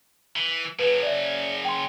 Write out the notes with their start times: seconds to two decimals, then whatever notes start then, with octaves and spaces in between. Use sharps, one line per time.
0.36 E3
0.79 C#3 F#3 B4
1.03 D5 E5
1.65 G5 C6